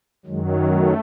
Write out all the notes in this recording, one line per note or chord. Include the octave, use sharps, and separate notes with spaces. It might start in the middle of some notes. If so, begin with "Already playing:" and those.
F#2 D#3 F#3 G#3
A3